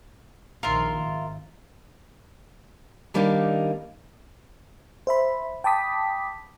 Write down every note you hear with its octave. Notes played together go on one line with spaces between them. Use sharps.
A#1 D#3 F3 F4 A#4 E5 C6
G#1
D#3 G3 A#3 D4 D#4
C5 E5 B5
G5 A5 B5 D6 D#6 B6